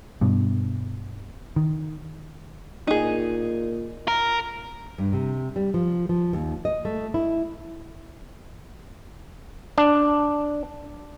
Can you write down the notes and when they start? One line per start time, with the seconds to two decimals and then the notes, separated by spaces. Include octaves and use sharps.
0.21 G2 B2
1.56 D#3
2.87 A#2 D#4 G#4
4.08 A#4
4.98 G2
5.13 C3
5.56 G3
5.74 F3
6.09 F3
6.33 D#2
6.65 D#5
6.85 A3
7.14 E4
9.78 D4